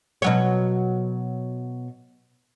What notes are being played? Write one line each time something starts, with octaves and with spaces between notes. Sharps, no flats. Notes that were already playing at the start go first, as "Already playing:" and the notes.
B2 F#3 C#5